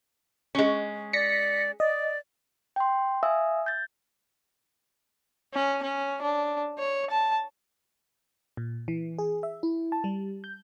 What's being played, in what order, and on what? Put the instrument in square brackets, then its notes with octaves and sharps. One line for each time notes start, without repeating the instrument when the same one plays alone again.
[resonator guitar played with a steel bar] G#3 C#4
[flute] D5 [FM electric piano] A#6 B6 C#7
[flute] D5 [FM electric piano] D#5
[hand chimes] G5 C6
E5 F5 G#5 D#6 E6
G6 A6
[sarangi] C#4
C#4
D4
C#5
A5
[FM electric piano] A#2
E3
G#4
E5
E4
A5
G3
G6